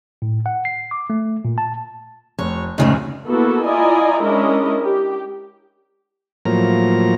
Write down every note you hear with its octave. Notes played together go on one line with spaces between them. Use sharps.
A2
F#5
C7
D6
A3
A#2
A5
F1 C#5
F1 D2 A2 C#3 G#3 D#4
A#3 B3 E4 F#4 A4
E4 F4 D5 D#5 G#5 A#5
G#3 C#4 D4 E4 A#4 D#5
G4
A2 F3 F#3 A#3 A#5